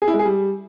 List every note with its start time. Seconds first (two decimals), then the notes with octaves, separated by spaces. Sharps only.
0.02 G#4
0.08 E4
0.13 G#3
0.19 G#4
0.25 G3